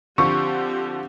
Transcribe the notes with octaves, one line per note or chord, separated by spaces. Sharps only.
D3 F3 C4 G4 C#6